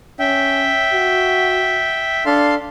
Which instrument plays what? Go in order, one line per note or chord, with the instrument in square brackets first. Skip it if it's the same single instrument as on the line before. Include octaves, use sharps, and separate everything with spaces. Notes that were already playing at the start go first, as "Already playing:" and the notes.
[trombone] C#4 [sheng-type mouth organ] E5 G5
[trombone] F#4
[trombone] D4 [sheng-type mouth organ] A4 F5 C6